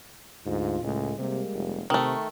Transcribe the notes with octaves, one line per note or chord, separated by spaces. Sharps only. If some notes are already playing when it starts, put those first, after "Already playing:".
D2 G#2 F4
C#2 A2 G#3
C3 G3 G#3 A#3
F1
C3 D#3 A3